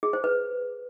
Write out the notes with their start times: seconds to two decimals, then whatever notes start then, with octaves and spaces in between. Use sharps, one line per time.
0.03 G#4
0.13 C5
0.24 B4